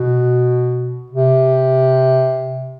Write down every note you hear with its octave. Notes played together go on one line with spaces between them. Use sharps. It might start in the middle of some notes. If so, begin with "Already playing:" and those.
Already playing: B2
C3